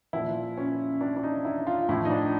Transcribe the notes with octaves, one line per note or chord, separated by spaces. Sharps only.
A#2 F3 E4
C#4
D4
D4
D#4
E4
F4
A2 F3 E4
D#4
D4